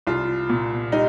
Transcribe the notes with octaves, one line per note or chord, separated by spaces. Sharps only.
C2 F4
A#2
G3 D#4